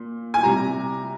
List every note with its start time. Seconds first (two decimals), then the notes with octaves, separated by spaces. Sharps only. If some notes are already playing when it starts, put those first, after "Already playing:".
Already playing: A#2
0.34 G#5
0.43 C3 G3 A#5